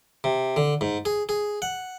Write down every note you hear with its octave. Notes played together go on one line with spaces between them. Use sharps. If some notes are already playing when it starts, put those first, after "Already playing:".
C3
D3
G#2
G#4
G#4
F#5